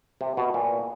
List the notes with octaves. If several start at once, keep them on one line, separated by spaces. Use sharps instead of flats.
C3
B2
A#2